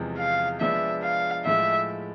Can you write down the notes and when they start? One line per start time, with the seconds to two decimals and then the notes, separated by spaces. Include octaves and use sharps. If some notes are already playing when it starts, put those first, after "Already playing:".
Already playing: E2 C3 F3 G#3
0.18 F5
0.60 F3 G#3 B3 D4 E5
1.03 F5
1.45 A2 F3 G#3 E5